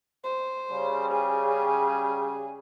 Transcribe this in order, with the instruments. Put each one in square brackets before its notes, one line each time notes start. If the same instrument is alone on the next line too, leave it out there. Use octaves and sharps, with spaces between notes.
[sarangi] C5
[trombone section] C#3 G3
[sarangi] G#4